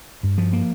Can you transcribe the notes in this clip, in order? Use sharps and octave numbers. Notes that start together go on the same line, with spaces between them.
G2
F3
A#3